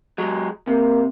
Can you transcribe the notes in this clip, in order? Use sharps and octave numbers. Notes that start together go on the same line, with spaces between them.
F#3 G#3
C3 A#3